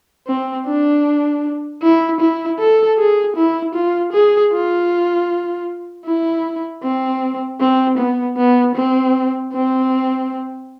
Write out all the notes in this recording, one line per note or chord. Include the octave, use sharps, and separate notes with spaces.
C4
D4
E4
E4
A4
G#4
E4
F4
G#4
F4
E4
C4
C4
B3
B3
C4
C4